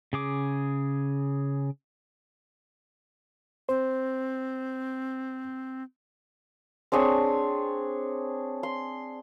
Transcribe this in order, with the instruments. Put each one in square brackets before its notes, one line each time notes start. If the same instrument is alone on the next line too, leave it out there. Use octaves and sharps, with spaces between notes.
[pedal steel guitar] C#3 G#4 D6
[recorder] C4 [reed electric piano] C5
[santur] C4 D4 G#4 C#5
C6